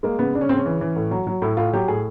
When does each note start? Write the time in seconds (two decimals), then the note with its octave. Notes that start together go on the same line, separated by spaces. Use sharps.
0.03 G#3 A#3
0.19 C#3 B3
0.35 C#3 D4
0.41 C#4
0.49 C#3 C4
0.57 C#4
0.66 E3
0.81 E3
0.96 A2
1.11 F#3
1.27 F#3
1.42 A2 E4
1.57 A2 F4
1.73 F#3 G4
1.88 A2 G#4